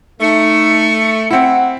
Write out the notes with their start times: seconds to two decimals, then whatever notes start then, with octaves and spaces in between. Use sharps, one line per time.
0.21 A3 D#4 C#7
1.31 C4 E4 F#5